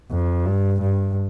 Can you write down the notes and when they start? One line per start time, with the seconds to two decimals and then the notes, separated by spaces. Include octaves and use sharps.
0.11 F2
0.46 G2
0.82 G2